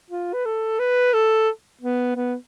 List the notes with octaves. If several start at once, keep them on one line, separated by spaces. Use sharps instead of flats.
F4
B4
A4
B4
A4
B3
B3